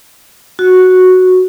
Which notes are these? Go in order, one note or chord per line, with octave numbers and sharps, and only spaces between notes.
F#4